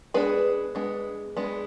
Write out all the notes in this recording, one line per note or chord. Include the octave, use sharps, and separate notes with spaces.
G#3 B3 D4 G#4 B4
G#3 B3 D4
G#3 B3 D4